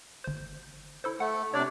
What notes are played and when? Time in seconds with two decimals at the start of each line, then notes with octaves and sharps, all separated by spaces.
0.24 G1 C5
1.04 E4 A4 C5
1.20 A3 F#5
1.54 C3 D4 C#5 D5